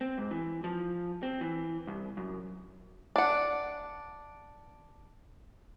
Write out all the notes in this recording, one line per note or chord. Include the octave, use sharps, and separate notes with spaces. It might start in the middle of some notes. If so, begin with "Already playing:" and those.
C4
G#2
E3
F3
C4
E3
C2
F#2
D4 F#5